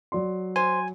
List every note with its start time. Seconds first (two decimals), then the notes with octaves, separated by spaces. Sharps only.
0.12 F#3 D5 C6
0.56 C5 G#5